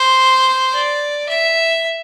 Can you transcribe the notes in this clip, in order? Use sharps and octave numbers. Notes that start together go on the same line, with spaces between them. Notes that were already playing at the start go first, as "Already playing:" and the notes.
Already playing: C5
D5
E5